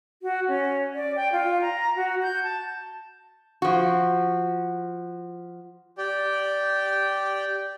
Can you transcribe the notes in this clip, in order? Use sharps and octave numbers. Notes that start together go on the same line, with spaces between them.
F#4
C#4
D5
G5
F4
A#5
F#4
G6
A5
F3 F#4
G4 D5 G5